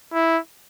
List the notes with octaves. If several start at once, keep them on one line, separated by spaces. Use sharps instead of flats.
E4